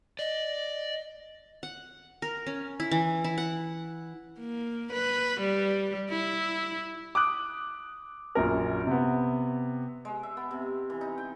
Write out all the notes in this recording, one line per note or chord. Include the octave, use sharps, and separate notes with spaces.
D5 D#5
F#5
A#4
C#4
E4
E3
E4
F#5
A#3
B4
G3
E4
D6 D#6 F#6
A#1 F#2 A#4
C3 B3
G#3
E5
B3
C3
E3
D#4
G5